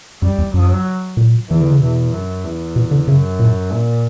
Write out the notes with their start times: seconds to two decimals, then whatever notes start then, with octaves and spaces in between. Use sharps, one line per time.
0.22 F#2 G3
0.38 E2
0.54 F#2 F#3
1.17 A#2
1.49 E2 E3
1.61 D3
1.71 C#3
1.80 E2 B2
2.13 F#2
2.44 E2
2.76 B2
2.91 D3
3.08 F#2 C#3
3.39 A#2
3.72 A#2